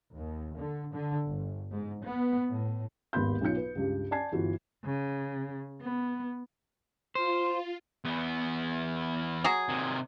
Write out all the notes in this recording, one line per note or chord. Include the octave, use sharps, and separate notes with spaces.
D#2
D3
D3
G1
G#2
B3
A2
G#1 D#2 B3 B5 C6 G6
B1 F#3 D#4 F4 G6 C#7
B4
C#2 G2
D5 G#5 A5 G#6 C7
G1 E3 F4 F#4
C#3
B3
F4 C5
E2 B3
F#3 G#4
C3 D#3